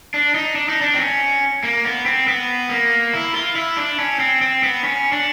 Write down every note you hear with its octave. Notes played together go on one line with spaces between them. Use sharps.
D4
D#4
D4
D#4
D4
C4
C#4
A#3
B3
C4
B3
A#3
E4
F4
E4
D4
C#4
C4
C4
B3
C#4
D4